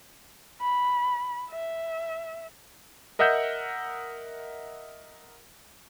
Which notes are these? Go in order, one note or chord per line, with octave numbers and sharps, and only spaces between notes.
B5
E5
A#4 D#5 E5 F#5 E6 G6